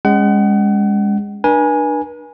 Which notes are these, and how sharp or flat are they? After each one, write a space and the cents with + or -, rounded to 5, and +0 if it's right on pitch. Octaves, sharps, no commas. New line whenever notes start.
G#3 -25 C#4 +0 F#5 +35
D4 +25 B4 -45 G#5 +0